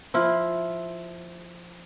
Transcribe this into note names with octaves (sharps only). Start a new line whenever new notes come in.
F3 E4 F4